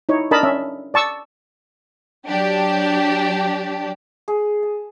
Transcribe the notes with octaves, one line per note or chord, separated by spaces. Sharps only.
D#4 E4 C#5
D4 A#4 D#5 A5 B5
C#4 E5
D5 A5 C#6 E6
F#3 D4 G4
G#4
A5